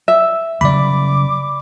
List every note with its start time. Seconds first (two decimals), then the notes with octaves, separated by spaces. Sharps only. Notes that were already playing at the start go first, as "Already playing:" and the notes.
0.08 E5
0.61 C#3 F#3 G3 D5 B5 D6